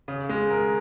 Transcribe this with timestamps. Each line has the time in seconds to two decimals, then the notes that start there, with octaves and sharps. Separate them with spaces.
0.08 C#3
0.29 G#3
0.51 A#4